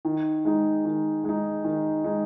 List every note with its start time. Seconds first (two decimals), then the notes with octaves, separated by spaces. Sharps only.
0.05 D#3
0.45 G#3 D#4
0.85 D#3
1.24 G#3 D#4
1.64 D#3
2.05 G#3 D#4